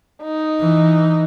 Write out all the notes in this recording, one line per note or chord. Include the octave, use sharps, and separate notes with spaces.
D#4
E3